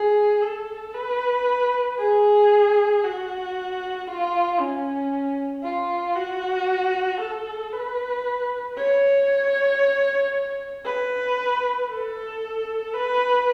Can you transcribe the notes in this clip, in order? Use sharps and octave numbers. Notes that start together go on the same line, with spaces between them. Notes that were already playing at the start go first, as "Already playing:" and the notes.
Already playing: G#4
A4
B4
G#4
F#4
F4
C#4
F4
F#4
A4
B4
C#5
B4
A4
B4